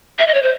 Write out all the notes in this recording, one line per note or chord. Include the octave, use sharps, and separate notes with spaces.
E5
D#5
C#5
C5